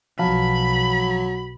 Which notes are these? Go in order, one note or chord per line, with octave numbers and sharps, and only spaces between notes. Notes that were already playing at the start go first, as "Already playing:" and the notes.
B1 F3 F#3 F5 A5 B5